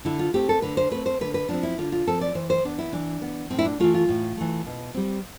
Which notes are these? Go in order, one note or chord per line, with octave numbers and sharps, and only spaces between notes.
D3 E4
F4
A3 C4 G4
A4
D3 B4
C5
A3 C4 B4
C5
D3 B4
B4
F3 C4 D4
E4
D3 F4
F4
F3 C4 A4
D5
E3 C5
C5
B3 D4
E4
E3 D4
B3
A2 C4
E4
D4
E3 A3 F4
F4
A2
E3 A3
B2
G3 C4